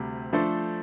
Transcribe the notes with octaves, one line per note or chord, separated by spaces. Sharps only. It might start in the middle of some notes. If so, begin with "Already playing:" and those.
Already playing: D2 C3 G3
F3 A3 D4 A4 C5